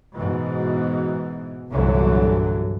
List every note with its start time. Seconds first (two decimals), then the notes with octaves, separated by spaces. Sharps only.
0.15 G#2 B2 E3
1.70 G1 C2 A#2 D3 E3 F#3